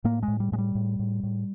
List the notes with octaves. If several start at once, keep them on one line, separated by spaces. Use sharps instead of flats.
A2 A#3
G#3
A2
G3
A2 G#3
G3
A2
A2
A2